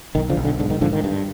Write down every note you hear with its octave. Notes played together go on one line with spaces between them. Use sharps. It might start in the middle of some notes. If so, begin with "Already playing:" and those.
B1 D#3
D3 F3
B1
D3
G#2 D3
D#3
G#2 D3 F3
D#3
G2